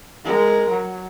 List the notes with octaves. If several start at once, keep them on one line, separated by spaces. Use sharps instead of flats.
G#3 A#4
F#3